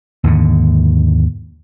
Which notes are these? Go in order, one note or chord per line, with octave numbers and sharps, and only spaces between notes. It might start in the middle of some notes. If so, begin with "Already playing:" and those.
D#2 G#2 D3